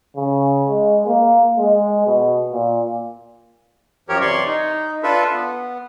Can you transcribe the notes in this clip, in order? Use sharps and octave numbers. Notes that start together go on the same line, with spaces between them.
C#3
G#3
A#3
G#3
B2
A#2
F#2 F3 G4 A#4 C#5
C3 E3 C#5 D5 C6 C#6
D#4
D4 F4 A4 B4 E5
B3